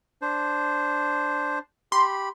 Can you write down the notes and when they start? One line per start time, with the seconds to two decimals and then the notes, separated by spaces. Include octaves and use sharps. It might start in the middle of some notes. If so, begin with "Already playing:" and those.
0.22 D4 C5
1.92 G4 B5 C6